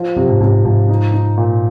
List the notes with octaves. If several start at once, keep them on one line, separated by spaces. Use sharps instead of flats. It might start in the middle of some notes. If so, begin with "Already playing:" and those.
Already playing: F3
F#2 C3
G#2
G#2 C3
G#2 F3
D#4
D#4
A#2